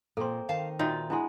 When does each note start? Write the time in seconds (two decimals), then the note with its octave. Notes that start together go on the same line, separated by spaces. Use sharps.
0.17 A#2 A#3 C4 A4 C6
0.49 D#3 F5 A5
0.79 A#2 D#4 F4 F#4 D#5 E5 G5
1.10 G#3 B3 D4 E4 C6